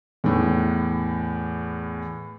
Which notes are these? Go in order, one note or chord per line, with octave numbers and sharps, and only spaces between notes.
E2 A2